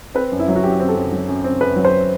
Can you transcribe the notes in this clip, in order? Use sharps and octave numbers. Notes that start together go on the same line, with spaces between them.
C4 B4
F#2
E4
F#3
F#4
F#2 G4
C4
A4
F#2
F#3
F#2
C4
F#2 B4
F#3
C5